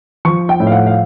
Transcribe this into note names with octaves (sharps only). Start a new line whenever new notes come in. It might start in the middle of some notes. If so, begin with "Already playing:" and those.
F3 C#6
G5
A2
F5
F#5
F5